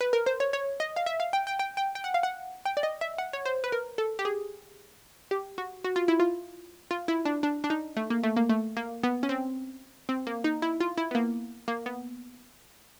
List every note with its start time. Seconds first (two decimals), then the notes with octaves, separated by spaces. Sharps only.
0.01 B4
0.13 A#4
0.26 C5
0.40 C#5
0.53 C#5
0.80 D#5
0.96 F5
1.06 E5
1.20 F5
1.33 G5
1.47 G5
1.59 G5
1.77 G5
1.95 G5
2.04 F#5
2.14 F5
2.23 F#5
2.65 G5
2.77 D5
2.83 D#5
3.01 E5
3.18 F#5
3.33 C#5
3.45 C5
3.64 B4
3.72 A#4
3.98 A4
4.19 G4
4.25 G#4
5.31 G4
5.58 F#4
5.84 F#4
5.96 F4
6.08 E4
6.20 F4
6.91 F4
7.08 E4
7.25 D4
7.43 D4
7.64 D4
7.70 D#4
7.97 A3
8.10 A#3
8.23 A3
8.37 A#3
8.49 A3
8.77 A#3
9.03 B3
9.23 C#4
9.29 C4
10.09 C4
10.27 A#3
10.44 D#4
10.62 E4
10.80 F4
10.98 E4
11.11 B3
11.15 A#3
11.68 A#3
11.86 B3